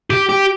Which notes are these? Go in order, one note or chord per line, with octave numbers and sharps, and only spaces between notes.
G4
G4